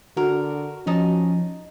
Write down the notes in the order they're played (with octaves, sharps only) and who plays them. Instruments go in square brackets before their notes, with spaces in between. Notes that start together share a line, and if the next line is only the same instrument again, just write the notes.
[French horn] D3 [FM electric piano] F#4 [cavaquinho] A#4
[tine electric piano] F3 [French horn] C#4 [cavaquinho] D#4 D#5 A5